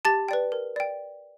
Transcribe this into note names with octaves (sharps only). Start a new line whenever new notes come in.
G4 A5 A6
B4 D5 G5
A#4
D5 G5